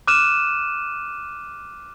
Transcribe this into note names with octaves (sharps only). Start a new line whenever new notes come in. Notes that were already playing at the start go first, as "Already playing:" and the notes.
D6 F6 F#6 D#7 E7